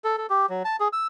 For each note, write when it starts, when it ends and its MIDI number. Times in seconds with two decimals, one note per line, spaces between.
0.04 0.17 69
0.18 0.27 69
0.30 0.46 67
0.49 0.63 54
0.65 0.76 81
0.80 0.88 68
0.93 1.07 88